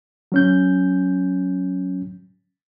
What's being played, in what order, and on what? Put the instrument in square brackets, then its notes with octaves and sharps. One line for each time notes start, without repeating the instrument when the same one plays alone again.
[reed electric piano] F#3 C#4 G6